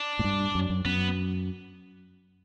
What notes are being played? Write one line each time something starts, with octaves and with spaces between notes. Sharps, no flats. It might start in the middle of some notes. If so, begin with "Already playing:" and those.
Already playing: D4
A2
G2
F#2
F#2
F#2 B3